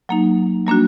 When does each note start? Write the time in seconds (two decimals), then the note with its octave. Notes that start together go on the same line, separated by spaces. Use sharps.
0.09 F#3 A#3 D#4
0.67 G3 A#3 D4 F#4